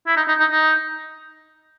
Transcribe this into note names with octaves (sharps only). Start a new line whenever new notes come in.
E4
D#4
D#4
D#4
D#4